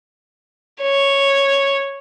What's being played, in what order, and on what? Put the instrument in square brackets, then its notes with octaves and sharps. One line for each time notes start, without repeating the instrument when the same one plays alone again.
[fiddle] C#5